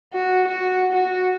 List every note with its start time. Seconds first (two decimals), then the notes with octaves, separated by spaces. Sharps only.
0.13 F#4
0.48 F#4
0.93 F#4